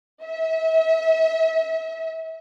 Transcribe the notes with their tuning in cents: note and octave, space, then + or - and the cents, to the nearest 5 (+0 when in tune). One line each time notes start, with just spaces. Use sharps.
E5 -35